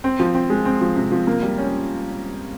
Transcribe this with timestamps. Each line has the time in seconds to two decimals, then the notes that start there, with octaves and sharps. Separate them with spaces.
0.04 C4
0.20 F3
0.35 C4
0.50 G#3
0.65 C4
0.81 F3
0.96 C3
1.12 F3
1.27 A#3
1.42 G3
1.58 C#4